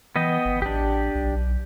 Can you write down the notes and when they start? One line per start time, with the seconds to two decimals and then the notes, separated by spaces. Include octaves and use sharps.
0.16 E3 B3 D#5 G5
0.45 G1
0.62 A1 D4 G4
1.15 B1